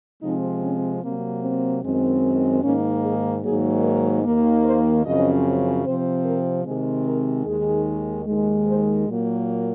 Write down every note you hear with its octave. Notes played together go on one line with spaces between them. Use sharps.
C3 F3 G#3 C4 D#4
C#4
C3 F#3 A#3 C4
C4
F#2 D#3 G#3 C4
G#2 D#3 A#3 C#4
G#4
G#2 D#3 F#3 A#3 G#4
A#4
D#2 D#3 A#3
C5
F#2 C#3 F3 C4 D#5
C3 F3 C4 C5
A#4
C3 D#3 G#3 C4 G#4
A#4
D#2 D#3 G#3 G#4
D#2 D#3 G#3
C5
A#2 F#3 A#3